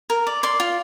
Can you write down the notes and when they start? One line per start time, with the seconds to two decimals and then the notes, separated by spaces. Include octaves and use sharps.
0.10 A#4
0.27 D5
0.43 D5 C6
0.60 F4